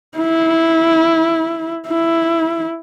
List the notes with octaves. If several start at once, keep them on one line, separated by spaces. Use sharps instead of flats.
E4
E4